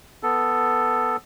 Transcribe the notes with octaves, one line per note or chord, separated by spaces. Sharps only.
B3 A4